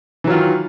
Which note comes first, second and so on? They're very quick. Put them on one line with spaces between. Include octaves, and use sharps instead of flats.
E3 F#3 F4 D#3